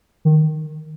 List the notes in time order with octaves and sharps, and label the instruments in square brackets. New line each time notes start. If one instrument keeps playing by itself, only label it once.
[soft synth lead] D#3